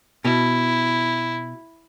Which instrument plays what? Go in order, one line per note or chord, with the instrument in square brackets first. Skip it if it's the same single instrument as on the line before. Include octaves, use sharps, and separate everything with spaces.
[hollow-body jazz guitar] B2 [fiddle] E4